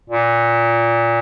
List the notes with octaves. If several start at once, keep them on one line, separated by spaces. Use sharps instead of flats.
A#2